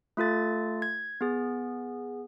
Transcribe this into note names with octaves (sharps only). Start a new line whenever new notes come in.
A3 F4 A4 A6
G#6
B3 G#4